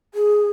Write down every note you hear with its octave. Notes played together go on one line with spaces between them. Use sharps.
G#4